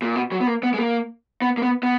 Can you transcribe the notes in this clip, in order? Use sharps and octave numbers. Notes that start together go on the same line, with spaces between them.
A#2
B2
F#3
B3
A#3
B3
G#3
A#3
B3
A#3
B3
B3